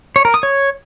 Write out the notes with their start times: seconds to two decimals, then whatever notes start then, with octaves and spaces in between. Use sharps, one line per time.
0.16 C#5
0.25 A#4
0.34 D#6
0.43 C#5